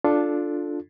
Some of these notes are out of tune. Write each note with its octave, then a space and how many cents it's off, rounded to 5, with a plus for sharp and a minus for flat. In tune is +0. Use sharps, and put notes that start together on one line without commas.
D4 +0 F4 +0 A4 -10